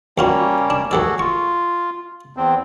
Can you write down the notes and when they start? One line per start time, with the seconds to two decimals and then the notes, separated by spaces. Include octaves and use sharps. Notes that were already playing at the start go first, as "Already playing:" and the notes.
0.18 D#2 G3 A#3 C#4 F4 F#4
0.70 D4
0.91 D#2 F#3 F#4 G#4 A4 D5
1.19 F4 C#6
2.37 E2 C4